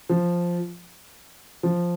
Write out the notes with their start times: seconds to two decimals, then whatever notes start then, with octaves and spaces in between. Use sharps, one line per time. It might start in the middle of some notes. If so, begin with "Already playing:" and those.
0.09 F3
1.63 F3